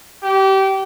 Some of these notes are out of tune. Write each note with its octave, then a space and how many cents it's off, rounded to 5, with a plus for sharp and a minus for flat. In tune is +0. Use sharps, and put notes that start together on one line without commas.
G4 -25